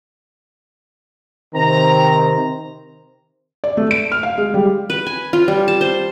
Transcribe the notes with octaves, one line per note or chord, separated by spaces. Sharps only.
C3 D#3 C4 A#5
D5
A3
D7
F6
F5
G#3
G3
B4
G#5
F4
G3
A5
C5